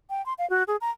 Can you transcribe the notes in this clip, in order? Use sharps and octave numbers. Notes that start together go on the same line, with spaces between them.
G5
C6
F5
F#4
G#4
A#5